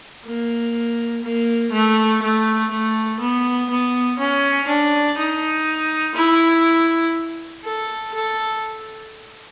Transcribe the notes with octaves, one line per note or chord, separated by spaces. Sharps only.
A#3
A#3
A3
A3
A3
B3
B3
C#4
D4
D#4
E4
A4
A4